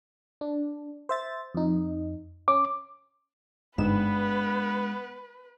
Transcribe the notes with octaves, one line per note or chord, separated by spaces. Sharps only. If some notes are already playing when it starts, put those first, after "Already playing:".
D4
C5 E5 A6
F2 D#4
C#4 D6
G1 G#2 G#3 B3 D4 B4 E7